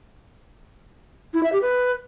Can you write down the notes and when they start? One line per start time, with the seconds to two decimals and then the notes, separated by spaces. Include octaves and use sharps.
1.34 E4
1.43 E5
1.52 G4
1.62 B4